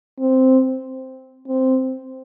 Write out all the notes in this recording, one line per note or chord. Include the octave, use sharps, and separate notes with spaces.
C4
C4